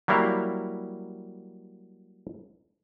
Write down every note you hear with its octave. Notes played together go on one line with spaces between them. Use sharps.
F#3 G3 A#3 E4 F5 A#5